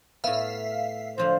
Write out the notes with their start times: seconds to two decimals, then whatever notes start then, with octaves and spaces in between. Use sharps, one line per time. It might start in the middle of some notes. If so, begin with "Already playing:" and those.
0.24 A2 B3 E5 F5
1.18 D3 F3 F#3 C5